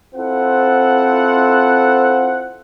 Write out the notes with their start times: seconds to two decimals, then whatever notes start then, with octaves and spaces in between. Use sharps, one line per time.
0.15 C4 E4 F4 A4 C5 F#5